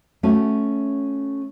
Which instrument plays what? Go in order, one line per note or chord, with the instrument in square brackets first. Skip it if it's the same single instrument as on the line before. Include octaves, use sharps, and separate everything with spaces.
[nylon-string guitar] A3 C#4 F#4 G#5